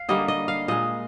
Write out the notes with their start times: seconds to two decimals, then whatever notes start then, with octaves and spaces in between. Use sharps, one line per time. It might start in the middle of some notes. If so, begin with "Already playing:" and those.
Already playing: F5
0.09 D3 G3 A#3 D#5
0.28 D#5
0.48 F5
0.68 A#2 G#3 D#5